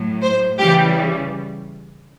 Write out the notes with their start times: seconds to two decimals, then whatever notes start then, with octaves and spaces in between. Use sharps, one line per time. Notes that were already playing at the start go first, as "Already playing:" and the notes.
Already playing: A2 F#3
0.22 C5
0.58 C#3 E3 G3 G4